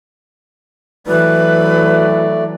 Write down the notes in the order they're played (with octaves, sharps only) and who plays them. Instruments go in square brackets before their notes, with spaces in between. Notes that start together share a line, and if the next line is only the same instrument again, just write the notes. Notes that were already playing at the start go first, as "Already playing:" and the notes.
[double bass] E3 F#3 [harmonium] A3 D5 [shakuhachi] B4